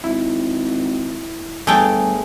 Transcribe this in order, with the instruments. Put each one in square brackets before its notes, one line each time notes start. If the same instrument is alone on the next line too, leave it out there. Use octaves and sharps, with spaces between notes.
[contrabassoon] G#1 [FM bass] E4
[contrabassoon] G1 [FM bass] G3 [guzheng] A3 G5 A5 [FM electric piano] G#4